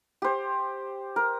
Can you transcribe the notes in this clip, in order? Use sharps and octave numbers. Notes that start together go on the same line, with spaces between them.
G4 C5
A#4